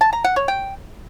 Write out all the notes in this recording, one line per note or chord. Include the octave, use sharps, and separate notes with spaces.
A5
A#5
F#5
C#5
G5